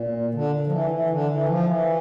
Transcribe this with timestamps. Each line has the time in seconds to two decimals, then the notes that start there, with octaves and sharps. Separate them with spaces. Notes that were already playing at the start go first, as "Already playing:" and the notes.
Already playing: A#2
0.34 D3
0.67 F3
0.72 E3
0.91 E3
1.10 D3
1.30 E3
1.48 F3
1.68 E3